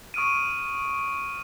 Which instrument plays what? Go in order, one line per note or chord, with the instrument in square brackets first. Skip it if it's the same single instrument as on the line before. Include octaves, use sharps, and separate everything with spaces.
[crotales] C#6 D#6 F6 D7 D#7